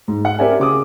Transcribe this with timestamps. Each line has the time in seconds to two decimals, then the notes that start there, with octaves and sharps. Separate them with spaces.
0.08 G#2
0.25 F#5
0.39 C4 G4 A#4 D5 E5 G#5
0.60 C#3 D6 D#6